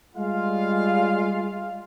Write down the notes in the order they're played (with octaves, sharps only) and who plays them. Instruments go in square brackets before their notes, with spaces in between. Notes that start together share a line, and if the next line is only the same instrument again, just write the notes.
[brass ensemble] G3 G#3 F4 F5